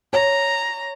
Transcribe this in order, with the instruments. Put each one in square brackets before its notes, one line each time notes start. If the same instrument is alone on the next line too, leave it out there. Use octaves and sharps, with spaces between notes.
[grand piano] C#5 [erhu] A#5